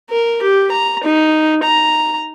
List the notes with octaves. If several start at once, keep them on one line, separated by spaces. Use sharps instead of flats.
A#4
G4
A#5
D#4
A#5